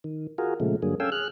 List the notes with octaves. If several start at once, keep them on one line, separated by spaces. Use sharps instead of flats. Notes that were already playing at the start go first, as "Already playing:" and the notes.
D#3
F4 F#4 G#4 A#4
A#2 C#3 F3 G#3 A3
G2 D3 F#3 A#3 G#4
C#4 A4 F5 G5 G#5 E6
G#4 F6 F#6